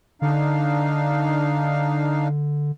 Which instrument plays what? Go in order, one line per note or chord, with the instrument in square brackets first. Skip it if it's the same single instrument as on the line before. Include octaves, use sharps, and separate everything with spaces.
[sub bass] D3 [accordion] D4 D#4 F5